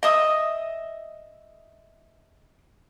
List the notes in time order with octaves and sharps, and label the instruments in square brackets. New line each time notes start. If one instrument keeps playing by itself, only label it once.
[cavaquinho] D#5 E5 D#6